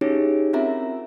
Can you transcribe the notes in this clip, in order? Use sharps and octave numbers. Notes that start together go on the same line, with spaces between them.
C#4 D#4 E4 G4 G#4 C#5
C4 C#4 F4 A#4 E5 A#5